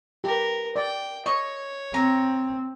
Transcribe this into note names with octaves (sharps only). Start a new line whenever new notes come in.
G4 A#4 B4
D5 G5
C#5 D#5 C#6
C4 A#5